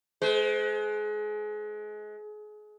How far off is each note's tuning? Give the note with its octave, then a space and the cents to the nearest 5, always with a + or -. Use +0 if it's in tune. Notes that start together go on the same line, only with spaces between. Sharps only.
G#3 +30 C5 -30